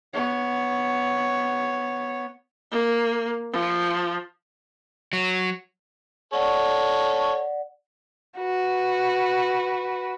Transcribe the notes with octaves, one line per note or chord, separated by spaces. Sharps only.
B3 C#5
A#3
F3
F#3
A4 C#5 D5 F#5
F#4 B4